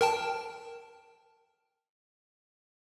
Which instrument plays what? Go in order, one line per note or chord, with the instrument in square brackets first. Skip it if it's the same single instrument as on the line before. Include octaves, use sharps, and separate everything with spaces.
[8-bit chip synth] A#4 G5 A5